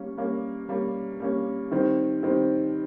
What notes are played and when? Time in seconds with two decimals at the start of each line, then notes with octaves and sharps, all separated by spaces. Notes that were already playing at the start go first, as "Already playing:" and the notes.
Already playing: G3 A#3 C#4
0.17 G3 A#3 C#4
0.69 G3 A#3 C#4
1.20 G3 A#3 C#4
1.72 D#3 G3 C4
2.23 D#3 G3 C4